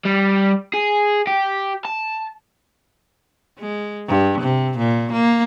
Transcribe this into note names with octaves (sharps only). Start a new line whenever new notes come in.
G3
G#4
G4
A5
G#3
G2
C3
A#2
A#3